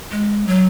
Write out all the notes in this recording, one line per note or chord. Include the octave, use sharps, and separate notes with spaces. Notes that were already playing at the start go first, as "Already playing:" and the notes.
G#3
F#3